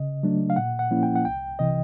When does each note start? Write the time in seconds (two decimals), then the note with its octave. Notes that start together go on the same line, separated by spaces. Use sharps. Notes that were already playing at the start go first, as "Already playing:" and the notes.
Already playing: C#3 D#5
0.23 F#3 A3 D4
0.50 F5
0.56 A#2 F#5
0.79 F#5
0.91 F3 A#3 C#4 E4
1.03 G5
1.16 F#5
1.25 C2 G5
1.59 C3 E3 D#5